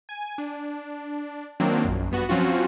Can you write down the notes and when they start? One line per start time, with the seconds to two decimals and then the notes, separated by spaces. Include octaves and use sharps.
0.09 G#5
0.38 D4
1.60 D#3 F#3 A#3 C4 D4
1.85 A#1 F#2
2.11 G2 B3 F#4
2.29 F3 F#3 C4 C#4 F4 F#4